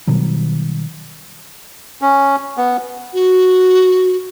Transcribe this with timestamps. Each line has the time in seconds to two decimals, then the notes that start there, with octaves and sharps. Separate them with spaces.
0.07 B2 D#3 F#3 G3
2.02 C#4
2.57 B3
3.13 F#4